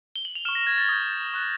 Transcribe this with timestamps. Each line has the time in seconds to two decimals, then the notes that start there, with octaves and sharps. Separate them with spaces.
0.16 G7
0.25 F#7
0.35 F7
0.45 F6 E7
0.49 C#6
0.55 A#6
0.67 G#6
0.78 A6
0.89 D#6 G6
1.34 C#6 F#6